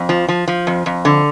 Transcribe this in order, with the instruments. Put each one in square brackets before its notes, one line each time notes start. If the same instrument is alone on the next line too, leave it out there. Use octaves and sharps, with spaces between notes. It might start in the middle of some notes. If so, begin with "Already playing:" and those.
Already playing: [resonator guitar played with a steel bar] F2
F3
F3
F3
F2
F2
D3